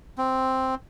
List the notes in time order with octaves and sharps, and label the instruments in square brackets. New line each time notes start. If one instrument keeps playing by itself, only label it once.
[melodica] C4